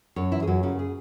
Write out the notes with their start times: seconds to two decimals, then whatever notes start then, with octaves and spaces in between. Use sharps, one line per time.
0.16 F#2 C#5
0.32 E3 E4
0.42 G#4
0.47 F#2 F#4
0.63 C#3 F#4
0.79 G#4